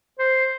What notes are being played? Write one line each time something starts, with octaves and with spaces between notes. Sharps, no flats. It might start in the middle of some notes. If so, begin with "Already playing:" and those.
C5